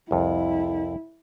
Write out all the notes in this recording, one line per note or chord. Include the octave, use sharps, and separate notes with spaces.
C2 F2 E4